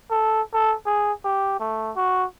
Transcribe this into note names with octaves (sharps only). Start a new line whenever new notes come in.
A4
A4
G#4
G4
A3
F#4